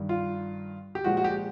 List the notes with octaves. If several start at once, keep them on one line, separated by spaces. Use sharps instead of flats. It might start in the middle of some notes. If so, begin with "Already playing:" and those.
Already playing: G2 D#3 G3
F4
G4
A#2 F3 G#3 F#4
F#4
G4